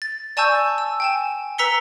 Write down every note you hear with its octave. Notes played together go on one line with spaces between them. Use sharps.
A6
D5 G#5 A5 C#6 E6 G6
E6
G5 G#5 E7
B4 A#5 E6 B6 C#7 G7